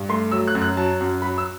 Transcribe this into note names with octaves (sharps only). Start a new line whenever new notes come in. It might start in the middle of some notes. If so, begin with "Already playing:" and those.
Already playing: G2
A3 C6
F#3 E6
F#6
F#2
F#6
F#3 A5
F#2
F#3 B5
E6